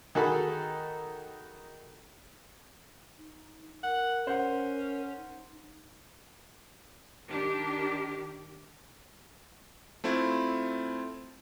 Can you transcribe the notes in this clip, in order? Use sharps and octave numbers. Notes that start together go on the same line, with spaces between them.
D#3 D#4 F#4 G#4 A4 B5
D#4
A#4 F#5
C#4 C5 F#5
D#4
D#3 D4 G4
A3 C4 E4 F4